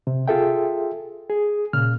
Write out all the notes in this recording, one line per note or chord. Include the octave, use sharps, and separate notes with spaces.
C3
F4 G#4 A4 E5 G5
G#4
A#2 C#3 F6